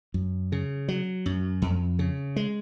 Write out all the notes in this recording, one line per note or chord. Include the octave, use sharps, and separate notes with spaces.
F#2
C#3
F#3
F#2
F2
C#3
G#3